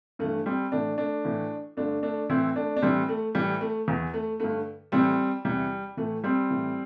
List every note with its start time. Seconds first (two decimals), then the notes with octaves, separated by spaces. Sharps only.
0.19 G2 E3 A3
0.46 G3 C4
0.72 A2 E3 A3 D4
0.98 A3 D4
1.25 A2 E3
1.77 G2 D3 A3 D4
2.03 A3 D4
2.30 A2 E3 C4 E4
2.56 A3 D4
2.77 D4
2.82 A2 E3 G3 C4
3.09 A3
3.35 A2 E3 G3
3.61 A3
3.88 E2 E3
4.14 A3
4.40 G2 D3 A3
4.92 A2 E3 G3 C4
5.45 E2 C3 E3 G3
5.97 A2 E3 A3
6.24 G3 C4
6.50 A2 E3